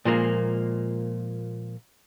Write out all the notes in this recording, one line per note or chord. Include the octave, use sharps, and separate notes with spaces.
A#2 F3 G#3 A#3